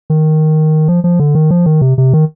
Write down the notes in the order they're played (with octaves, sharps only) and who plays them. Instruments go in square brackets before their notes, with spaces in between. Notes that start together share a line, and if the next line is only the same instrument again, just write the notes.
[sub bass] D#3
F3
F3
D3
D#3
F3
D#3
C3
C3
D#3